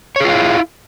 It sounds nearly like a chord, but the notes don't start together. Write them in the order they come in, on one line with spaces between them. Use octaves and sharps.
C#5 G#4 F4 F5 E4